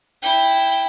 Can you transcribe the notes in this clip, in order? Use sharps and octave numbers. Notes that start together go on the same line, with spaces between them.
E4 G5